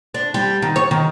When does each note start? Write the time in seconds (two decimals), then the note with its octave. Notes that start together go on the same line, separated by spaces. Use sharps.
0.14 D4
0.34 G3
0.62 D#3
0.76 C#5
0.91 D#3